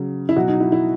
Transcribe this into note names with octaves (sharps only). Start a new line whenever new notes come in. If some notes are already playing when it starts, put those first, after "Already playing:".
Already playing: C#3 F#3
E4
B2 F#3 F#4
D#4
E4
E4